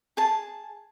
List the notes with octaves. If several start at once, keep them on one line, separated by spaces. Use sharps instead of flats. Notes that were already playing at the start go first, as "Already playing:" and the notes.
G#4 A5